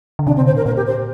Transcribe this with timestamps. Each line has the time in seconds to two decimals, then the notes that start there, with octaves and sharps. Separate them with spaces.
0.19 D3
0.26 C3 D4
0.36 C4
0.40 D3
0.46 C5
0.52 A#2 A#4
0.66 A#2 A#4
0.76 G4
0.86 C5